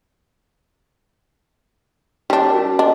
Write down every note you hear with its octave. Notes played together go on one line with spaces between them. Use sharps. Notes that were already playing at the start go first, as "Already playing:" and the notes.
G3 C#4 D4 C#5
F#4 A#4
D4 D#5